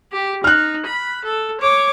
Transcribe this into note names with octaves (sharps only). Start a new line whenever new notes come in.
G4
D#4 F6 F#6
B5
A4
C#5 D6